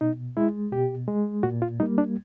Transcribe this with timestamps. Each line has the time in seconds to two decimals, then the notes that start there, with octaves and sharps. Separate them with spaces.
0.01 B2 D#4
0.37 G#3 E4
0.72 B2 G4
1.07 G#3
1.43 A#2 F#4
1.62 F4
1.80 G3 A#3 D#4
1.98 D4